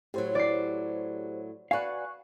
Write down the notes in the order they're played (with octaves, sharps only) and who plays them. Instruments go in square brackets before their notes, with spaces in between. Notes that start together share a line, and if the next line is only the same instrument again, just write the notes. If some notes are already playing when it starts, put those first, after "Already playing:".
[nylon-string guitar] A2 F#3 [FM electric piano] G4 C5
[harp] D5 C7
[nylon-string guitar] F#4 B4 [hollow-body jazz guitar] D5 F5 [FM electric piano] G#5 C#6 F#6